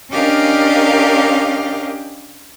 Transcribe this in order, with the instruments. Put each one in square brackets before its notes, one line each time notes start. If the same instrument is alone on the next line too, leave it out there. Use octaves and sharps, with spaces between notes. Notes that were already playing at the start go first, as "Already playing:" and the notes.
[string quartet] C#4 D4 G4 A#4 D#5 F5